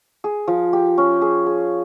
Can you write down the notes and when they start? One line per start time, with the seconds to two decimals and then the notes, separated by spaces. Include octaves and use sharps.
0.24 G#4
0.48 F3
0.73 G4
0.98 C#4
1.21 G#4
1.47 G#4